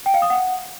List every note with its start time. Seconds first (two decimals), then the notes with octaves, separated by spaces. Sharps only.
0.06 G5
0.14 F5
0.22 D#6
0.30 F#5